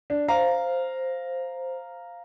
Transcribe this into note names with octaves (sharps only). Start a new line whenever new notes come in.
D4
C5 F5 A#5